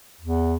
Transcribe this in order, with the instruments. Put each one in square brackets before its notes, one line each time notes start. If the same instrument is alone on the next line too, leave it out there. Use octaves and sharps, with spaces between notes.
[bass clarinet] E2